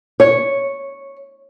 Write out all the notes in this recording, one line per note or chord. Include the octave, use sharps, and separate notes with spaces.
C#5